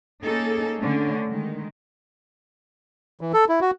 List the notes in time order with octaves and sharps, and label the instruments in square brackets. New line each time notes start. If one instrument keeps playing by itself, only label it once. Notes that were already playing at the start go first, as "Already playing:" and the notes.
[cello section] A#3 C#4 D#4 G#4 A4
D3 A3 C#4 D4
D#3 G#3
[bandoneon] E3
A4
E4
F#4